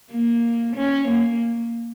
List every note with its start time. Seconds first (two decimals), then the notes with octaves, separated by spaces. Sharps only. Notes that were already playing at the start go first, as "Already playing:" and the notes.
0.12 A#3
0.77 C#4
1.09 A#3